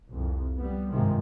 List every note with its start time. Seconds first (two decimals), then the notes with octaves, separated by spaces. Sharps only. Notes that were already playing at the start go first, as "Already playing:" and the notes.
0.10 C2 F2
0.57 G3 B3
0.91 G#1 G2 C3 D#3 F3 G#3